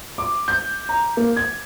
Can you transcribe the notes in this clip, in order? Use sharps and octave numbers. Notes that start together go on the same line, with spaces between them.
D6
G6
A#5
A#3
G#6